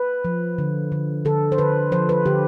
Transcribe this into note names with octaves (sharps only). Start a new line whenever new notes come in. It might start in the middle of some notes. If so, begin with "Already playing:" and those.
Already playing: B4
F3
D3
D3
D3 A4
C5
D3 B4
F3 C5
B4
D3 G4